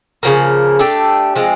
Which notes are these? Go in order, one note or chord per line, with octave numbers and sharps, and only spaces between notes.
C#3 F3 A#3
A3 D4 G4
F3 G#3 C4